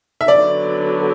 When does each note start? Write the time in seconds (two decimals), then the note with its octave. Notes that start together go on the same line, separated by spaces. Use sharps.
0.21 E5
0.28 D3 F#3 B3 D5